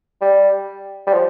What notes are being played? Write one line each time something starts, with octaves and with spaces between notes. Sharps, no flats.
G3
G3
F3